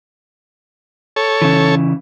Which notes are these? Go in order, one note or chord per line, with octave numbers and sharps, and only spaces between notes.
A4 C#5
C#3 E3